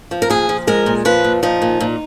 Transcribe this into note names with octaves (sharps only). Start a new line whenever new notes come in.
F3
A#4
A#2 G#4
F3
G#3 A#4
A#2
F3 B4
A#2
F3 D#4
A#2
A#2